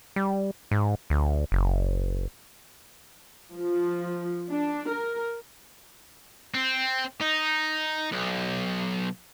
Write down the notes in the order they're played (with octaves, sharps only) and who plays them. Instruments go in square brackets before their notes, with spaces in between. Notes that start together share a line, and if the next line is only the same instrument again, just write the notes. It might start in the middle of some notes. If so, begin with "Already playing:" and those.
[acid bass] G3
G#2
D2
F#1
[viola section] F3
D4
A#4
[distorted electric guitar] C4
D#4
B1